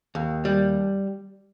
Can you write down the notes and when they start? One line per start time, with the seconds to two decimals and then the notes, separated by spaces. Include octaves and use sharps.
0.15 D#2
0.45 G3